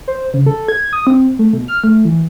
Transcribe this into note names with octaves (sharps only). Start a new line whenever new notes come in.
C5
C#3
A4
G#6
D#6
C4
A3
B2
F6
A3
E3